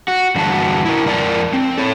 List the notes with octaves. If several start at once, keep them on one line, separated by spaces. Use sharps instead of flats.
F#4
E2 G2 D3 F#4 A5
E4 A#4
F2 A#4 D5 G#5 A5
C4
A4 C#5